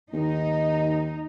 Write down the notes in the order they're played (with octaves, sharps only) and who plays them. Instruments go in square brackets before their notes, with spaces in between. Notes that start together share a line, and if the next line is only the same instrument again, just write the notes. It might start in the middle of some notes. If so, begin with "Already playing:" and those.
[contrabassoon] D#2 [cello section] D#4